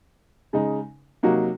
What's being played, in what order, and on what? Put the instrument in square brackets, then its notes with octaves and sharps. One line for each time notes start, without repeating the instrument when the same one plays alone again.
[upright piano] C#3 G#3 D#4
C3 F#3 A#3 D#4 F#4